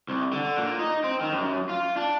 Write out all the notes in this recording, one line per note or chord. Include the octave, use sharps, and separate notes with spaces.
C2
D3
A#2
D#4
C4
D#3
F#2
F4
D4